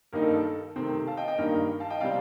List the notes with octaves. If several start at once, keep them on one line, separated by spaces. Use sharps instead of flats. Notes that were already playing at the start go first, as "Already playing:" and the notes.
G2 D#3 A#3 D#4 A#4
A4
A4
C3 D#3 A3 C4
F5 A5
D#5 G5
D#5 G5
G2 D#3 A#3 A#4
F5 A5
D#5 G5
C3 G3 C4 D5 F5